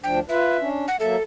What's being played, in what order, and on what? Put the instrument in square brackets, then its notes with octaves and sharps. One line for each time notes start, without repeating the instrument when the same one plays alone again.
[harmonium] D2 F3 D4 [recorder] G5
[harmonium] F4 B4 [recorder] E5
[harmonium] C#4 D4
[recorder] F#5
[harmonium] F#3 A#3 E5 [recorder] A4